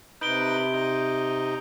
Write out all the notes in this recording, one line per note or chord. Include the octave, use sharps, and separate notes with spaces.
C3 D#4 B4 G6 D7 G7
D#4